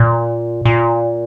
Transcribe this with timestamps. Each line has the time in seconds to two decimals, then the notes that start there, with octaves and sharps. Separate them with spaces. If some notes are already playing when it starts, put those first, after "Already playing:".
Already playing: A#2
0.65 A#2